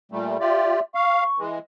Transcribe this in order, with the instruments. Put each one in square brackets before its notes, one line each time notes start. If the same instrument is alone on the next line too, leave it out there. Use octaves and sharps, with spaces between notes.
[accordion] A#2 G3 A3
[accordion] F4 G4 D5 [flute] E5
[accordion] F5 [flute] C#6
[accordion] E3 G#3